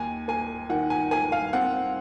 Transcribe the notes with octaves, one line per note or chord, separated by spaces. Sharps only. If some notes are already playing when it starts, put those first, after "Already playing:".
Already playing: D#2 G#5
A#3 G#5
D#3 F#5
G#5
A#3 G#5
F5
C4 F#5